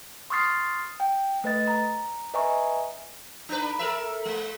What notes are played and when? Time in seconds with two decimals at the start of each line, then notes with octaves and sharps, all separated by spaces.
0.30 C6 C#6 D#6 F6 A6 C7
1.00 G5
1.44 A3 B4 D#5 A6
1.68 A#5
2.34 B4 D#5 E5 G#5 A#5 C#6
3.49 D4 B4
3.79 A4 A#4 E5
4.25 G#3